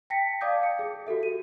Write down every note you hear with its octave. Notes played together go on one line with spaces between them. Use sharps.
G5 A5 A#6 B6 C#7
D5 F5 A5 D6 D#6 G6
C#7
G#4
F#4 G4 A4 E5
D#7